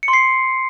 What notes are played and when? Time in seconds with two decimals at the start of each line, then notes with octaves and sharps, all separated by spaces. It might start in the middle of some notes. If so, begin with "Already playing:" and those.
0.03 C#7
0.08 C6
0.13 C7